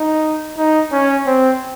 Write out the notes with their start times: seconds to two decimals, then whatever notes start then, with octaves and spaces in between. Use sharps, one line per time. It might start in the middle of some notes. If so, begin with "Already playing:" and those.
Already playing: D#4
0.58 D#4
0.92 C#4
1.26 C4